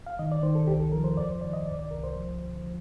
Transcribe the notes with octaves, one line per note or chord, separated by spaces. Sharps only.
F5
D#3 D#5
D5
D#3 C5
A4
C2 G4
A4
F3 A#4
C5
F2 D5
C5
D#3 D5
D#5
C2 D5
D5
C2 A#4
C5
F3
D3
F3